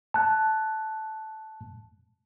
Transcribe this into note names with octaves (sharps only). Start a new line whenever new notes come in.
A5 F#6